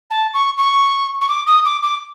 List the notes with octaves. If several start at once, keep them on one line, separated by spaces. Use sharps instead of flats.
A5
C#6
C#6
C#6
D6
D#6
D6
D6